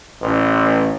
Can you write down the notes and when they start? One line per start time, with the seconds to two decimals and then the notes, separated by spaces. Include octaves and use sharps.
0.21 A1